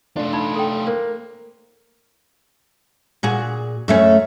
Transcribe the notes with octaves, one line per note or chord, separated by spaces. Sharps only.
A3 D4 F4
D#4 B5
A4 G5
A#3 C5
A#2 F#4 G#4
F#2 A3 C#4